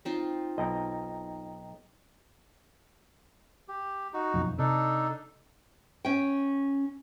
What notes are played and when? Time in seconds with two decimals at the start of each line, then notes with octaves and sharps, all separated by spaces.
0.05 C4 D#4 F4
0.58 B1 D#5 G5 A#5
3.68 G4
4.14 D#4 F#4
4.34 F#1 B1 F2
4.58 C3 D4 D#4 A4
6.05 C#4 G5